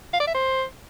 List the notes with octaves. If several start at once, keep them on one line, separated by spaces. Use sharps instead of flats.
F5
D5
E5
C5